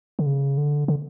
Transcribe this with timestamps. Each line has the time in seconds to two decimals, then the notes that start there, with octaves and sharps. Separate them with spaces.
0.19 D3
0.26 C#3
0.58 D3
0.88 D3